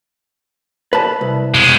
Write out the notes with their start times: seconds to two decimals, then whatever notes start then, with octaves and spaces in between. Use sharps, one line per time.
0.93 B4 A5
1.21 C2
1.55 B2 G#3